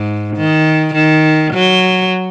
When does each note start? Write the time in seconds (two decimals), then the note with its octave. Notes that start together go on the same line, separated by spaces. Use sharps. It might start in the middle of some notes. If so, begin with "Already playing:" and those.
Already playing: G#2
0.37 D#3
0.94 D#3
1.54 F#3